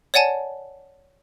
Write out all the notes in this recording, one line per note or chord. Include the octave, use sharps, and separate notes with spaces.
C#5 D5 F#5 G#5 A5